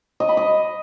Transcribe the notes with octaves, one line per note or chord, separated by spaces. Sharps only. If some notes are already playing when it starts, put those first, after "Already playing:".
D#5
B5
D#5